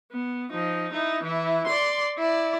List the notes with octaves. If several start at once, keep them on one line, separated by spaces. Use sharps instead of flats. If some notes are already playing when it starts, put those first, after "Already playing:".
B3
F3 D#4
D#4 E4
E3 E4
D5 C6
E4 D5